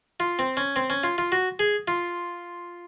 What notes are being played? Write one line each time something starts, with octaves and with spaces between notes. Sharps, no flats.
F4
C4
C#4
C4
C#4
F4
F4
F#4
G#4
F4